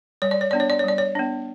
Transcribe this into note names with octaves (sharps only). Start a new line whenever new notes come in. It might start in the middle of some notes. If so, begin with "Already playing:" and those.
G3 C#5
D5
C#5
B3 D4 D5
C#5
D5
C#5
G3 D5
C#5
B3 D4